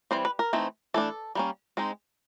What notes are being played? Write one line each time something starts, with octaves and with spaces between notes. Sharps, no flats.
E3 G3 C4 C5
B4
A#4
E3 A3 C4 D#4
E3 A3 D4 A4
G3 A#3 C#4
G#3 C4 D#4